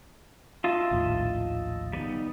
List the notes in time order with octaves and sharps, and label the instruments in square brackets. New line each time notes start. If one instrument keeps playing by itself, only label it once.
[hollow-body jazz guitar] F4 [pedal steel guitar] D#5 E5 A5
[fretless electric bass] A#1 D#2 A2
[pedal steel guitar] G3 B3 D#4